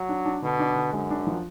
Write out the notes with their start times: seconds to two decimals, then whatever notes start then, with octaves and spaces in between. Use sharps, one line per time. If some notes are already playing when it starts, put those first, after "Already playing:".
Already playing: F#3
0.09 D4
0.25 D4
0.42 B2 D3
0.59 D4
0.76 D3
0.93 F#2 G#3
1.10 D4
1.27 F3